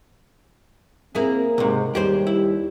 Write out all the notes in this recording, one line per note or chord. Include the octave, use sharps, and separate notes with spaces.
A#3 C4 E4 G#4
C#2 G#2 C3
D#2 G3 G4 G#4 C5
E4